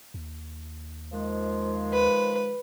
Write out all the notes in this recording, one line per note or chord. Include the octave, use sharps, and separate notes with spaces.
D#2
D#3 F3 G#3
B4